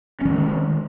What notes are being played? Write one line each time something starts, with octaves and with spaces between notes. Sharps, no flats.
D#3 G#3 A3 C#4